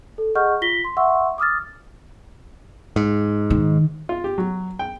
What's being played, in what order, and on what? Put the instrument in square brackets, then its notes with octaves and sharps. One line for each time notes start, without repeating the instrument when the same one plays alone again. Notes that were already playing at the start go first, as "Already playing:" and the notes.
[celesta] A4
G#4 D#5 F#5 C#6 F6 G6
F4 A#6 B6 G7
C6
E5 F#5 C6 C#6 E6
D6 D#6 F6 A6
[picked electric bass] G#2
[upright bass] D#3
[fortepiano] F4
G4
F#3
G5